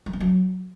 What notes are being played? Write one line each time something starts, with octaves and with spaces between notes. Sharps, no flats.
G3
C#4
F#3